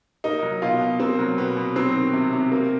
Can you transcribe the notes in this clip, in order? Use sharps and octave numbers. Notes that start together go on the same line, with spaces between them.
A#3 D#4
F#3
B2 F4
B2
A#3 C4
F#3
B2 B3
B2
F#3 C4
D#3
C3
C3
A#3